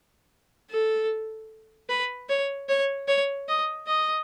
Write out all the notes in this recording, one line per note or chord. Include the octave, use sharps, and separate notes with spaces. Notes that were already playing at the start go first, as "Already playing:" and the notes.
A4
B4
C#5
C#5
C#5
D#5
D#5